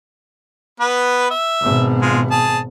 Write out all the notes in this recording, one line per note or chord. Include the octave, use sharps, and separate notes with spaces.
B3 B4
E5
G#1 B2
G#3 F4
G#4 A5